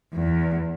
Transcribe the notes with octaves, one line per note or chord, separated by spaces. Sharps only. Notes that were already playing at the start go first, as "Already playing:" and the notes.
E2